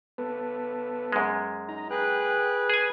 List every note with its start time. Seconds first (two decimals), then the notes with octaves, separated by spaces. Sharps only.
0.18 B3 A4 B4
1.12 F#2 G#3
1.69 D#4 A#5
1.91 G#4 B4 G5 F#6
2.70 G#4 B4 G#5